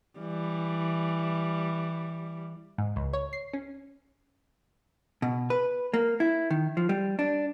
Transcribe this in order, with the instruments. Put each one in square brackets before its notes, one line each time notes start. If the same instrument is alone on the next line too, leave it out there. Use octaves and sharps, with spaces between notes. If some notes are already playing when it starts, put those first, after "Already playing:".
[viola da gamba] E3 G3
[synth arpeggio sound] G#2
C#2
C#5
C7
C#4
[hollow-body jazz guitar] B2
B4
A#3
E4
D#3
F3
G3
D4